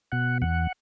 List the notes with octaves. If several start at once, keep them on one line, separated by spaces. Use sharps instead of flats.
B2 F#5
E2 F#5